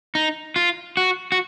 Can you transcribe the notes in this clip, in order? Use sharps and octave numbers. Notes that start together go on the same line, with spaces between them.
D#4
F4
F#4
F#4